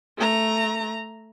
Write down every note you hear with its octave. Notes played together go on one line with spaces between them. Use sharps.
A3 A#5